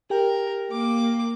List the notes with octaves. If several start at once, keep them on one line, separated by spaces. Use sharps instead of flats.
G4 A#4 G5
A#3 D6